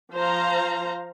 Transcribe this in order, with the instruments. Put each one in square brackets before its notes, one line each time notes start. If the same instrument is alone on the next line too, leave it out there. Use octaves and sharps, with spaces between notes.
[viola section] F3 C5 F5 A#5